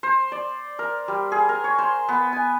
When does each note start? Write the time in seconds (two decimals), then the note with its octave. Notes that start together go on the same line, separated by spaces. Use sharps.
0.03 C5
0.32 D5
0.79 A#4
1.08 G3
1.32 G#4
1.49 A#4
1.64 C#5
1.79 C5
2.09 B3
2.33 G#5